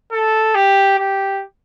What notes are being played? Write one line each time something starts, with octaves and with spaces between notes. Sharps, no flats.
A4
G4
G4